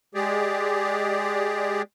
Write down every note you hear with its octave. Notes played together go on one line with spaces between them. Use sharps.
G#3 G4 G#4 D5